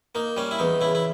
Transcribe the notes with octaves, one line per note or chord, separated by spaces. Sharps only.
A#3 D#4
G3 C#4
E4
E2 D#4
C#3 E4
E4